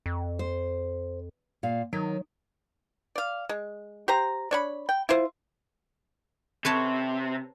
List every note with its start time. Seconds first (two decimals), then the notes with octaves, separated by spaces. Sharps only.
0.06 F2
0.39 C5
1.63 A#2 F5
1.93 D#3 F#3
3.15 D5 F5
3.49 G#3
4.08 G4 C5 A#5
4.51 D4 C#5 B5
4.89 G5
5.09 E4 F4 C5
6.65 C3 B4 C#5 A5